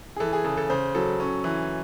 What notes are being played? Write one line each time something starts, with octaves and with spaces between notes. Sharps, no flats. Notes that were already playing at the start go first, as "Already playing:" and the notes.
G#4
E3 A4
G#4
C#3 A4
A4
C#3 C5
F#3 A4
C#4
E3